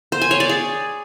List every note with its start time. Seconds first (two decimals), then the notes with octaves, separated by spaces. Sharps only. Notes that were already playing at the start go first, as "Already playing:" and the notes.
0.12 C5
0.21 G#5
0.31 C#5
0.40 D5
0.49 G#4